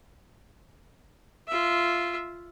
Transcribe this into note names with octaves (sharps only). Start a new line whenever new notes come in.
F4 E5